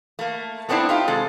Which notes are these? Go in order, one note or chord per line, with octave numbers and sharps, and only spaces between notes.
A3 A#3
A3 B3 C4 D4 E4
D#4 F4 G4
C3 G#3 A4